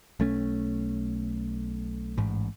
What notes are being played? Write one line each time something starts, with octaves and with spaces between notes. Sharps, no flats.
B1 A3 C#4
A1 G#2